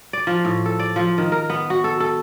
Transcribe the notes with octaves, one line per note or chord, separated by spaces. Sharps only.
D5
F3
A2
A4
D5
F3
D#3
A#4
B3
F#4
A4
A4